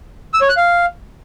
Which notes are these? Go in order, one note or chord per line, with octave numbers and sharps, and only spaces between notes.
E6
C#5
F#6
F5